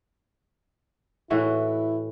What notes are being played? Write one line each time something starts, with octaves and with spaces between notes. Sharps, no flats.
A2 E3 E4 F#4